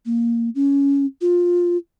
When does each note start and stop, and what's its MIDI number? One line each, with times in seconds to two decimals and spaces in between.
0.06 0.49 58
0.55 1.06 61
1.21 1.77 65